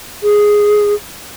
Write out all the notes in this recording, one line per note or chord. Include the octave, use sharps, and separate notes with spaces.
G#4